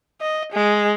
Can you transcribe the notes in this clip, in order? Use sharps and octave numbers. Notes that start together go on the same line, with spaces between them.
D#5
G#3